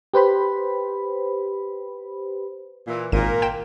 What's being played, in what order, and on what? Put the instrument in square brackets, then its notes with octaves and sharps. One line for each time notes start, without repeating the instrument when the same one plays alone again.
[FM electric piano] G4 B4 C5 B5
[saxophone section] A#2 E3
[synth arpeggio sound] G#1 D#7 [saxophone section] A#2 A#4
[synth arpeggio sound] G5 E7